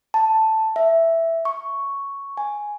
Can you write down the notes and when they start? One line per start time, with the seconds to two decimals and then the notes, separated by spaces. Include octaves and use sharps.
0.14 A5
0.76 E5
1.45 C#6
2.37 G#5